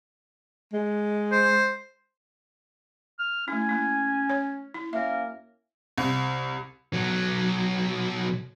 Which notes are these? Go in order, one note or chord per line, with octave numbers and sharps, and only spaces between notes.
G#3
C5
F6
A3 C#4 E4 G#5
A#3 E4
C#5
E4
F#2 A#3 C#4 A#4 E5
C2
B1 F#3